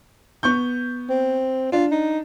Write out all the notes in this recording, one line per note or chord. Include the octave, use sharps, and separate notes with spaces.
B3 C#6 G6
C4
D4 F4
D#4